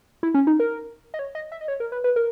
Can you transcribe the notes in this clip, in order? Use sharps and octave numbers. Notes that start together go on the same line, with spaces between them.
E4
C#4
D#4
A#4
D#5
C#5
D#5
E5
D#5
C#5
A#4
B4
B4
A#4